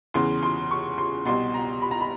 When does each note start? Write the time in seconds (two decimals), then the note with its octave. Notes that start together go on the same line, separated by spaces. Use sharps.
0.14 E2 C#3 E3 C6
0.43 C6
0.71 C#6
0.98 C6
1.25 C2 B2 C6
1.54 A#5
1.82 B5
1.91 A#5
2.01 B5